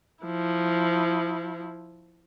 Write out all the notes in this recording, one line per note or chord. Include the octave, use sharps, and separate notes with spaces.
F3 E4